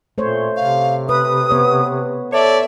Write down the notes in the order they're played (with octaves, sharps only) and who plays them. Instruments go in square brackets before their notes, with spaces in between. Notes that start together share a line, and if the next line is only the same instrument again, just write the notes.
[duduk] A#2 [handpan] A3 C5 C#5
[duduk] C3 [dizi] F5
[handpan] B4 [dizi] D#6
[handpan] B3 C#5
[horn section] A4 C#5 D5 [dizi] E5